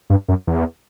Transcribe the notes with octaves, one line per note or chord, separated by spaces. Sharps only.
G2
F#2
E2